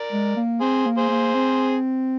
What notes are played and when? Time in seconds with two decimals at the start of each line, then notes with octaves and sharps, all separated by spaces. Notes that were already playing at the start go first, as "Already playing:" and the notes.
Already playing: A#4 D5
0.12 G#3
0.36 A#3
0.61 C4 G#4 C5
0.86 A#3
0.98 G#4 C5
1.10 A#3
1.34 C4